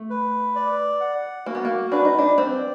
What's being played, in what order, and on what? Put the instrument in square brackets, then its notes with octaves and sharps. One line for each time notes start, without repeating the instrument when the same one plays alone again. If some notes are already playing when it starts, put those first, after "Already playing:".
Already playing: [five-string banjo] A3
[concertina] B4
D5
F#5
[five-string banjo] A#3 [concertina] F#4
[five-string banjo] B3
A#3
[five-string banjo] D4 [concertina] B4
[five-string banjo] D#4
D4
[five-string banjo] C4 [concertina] D5